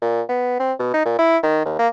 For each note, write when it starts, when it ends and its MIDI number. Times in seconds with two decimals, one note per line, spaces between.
0.02 0.22 46
0.29 0.58 59
0.60 0.73 60
0.79 0.92 47
0.94 1.04 63
1.05 1.15 46
1.19 1.38 64
1.43 1.63 51
1.65 1.78 39
1.79 1.88 58